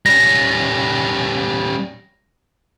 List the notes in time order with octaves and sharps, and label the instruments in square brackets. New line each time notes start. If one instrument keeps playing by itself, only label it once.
[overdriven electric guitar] G3 C#4 [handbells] A#6